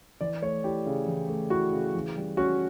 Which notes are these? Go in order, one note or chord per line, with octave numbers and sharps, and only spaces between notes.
E3 D5
A3 C#5
E4 G4
C#3
E3
A3
E4 F#4
C#3
E3
G3
C#4 F#4